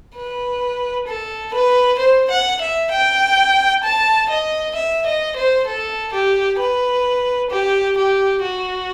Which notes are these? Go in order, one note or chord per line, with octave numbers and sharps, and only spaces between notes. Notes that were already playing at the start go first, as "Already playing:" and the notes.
B4
A4
B4
C5
F#5
E5
G5
A5
D#5
E5
D#5
C5
A4
G4
B4
G4
G4
F#4